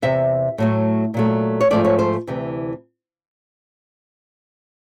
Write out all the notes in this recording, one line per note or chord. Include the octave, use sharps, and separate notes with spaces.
E2 C3 E5
A2 F#3 A3
A#2 F#3 A3
C#5
G#2 F3 A3 D5
C#5
C5
D2 C3 E3